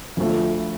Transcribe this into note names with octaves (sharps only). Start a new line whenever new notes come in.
D2 D3 F3 A3